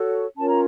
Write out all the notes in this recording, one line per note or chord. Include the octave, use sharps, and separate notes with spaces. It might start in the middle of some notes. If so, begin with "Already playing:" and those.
Already playing: F#4 A4 C#5
C#4 F4 A#4 C#5 A5
A#5